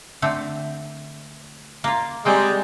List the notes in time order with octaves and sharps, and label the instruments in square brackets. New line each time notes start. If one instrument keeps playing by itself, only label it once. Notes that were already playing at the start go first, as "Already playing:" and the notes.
[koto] D3 A3 C4
A#3 F4
[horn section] G3 G#3 [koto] A#3 C4 D#5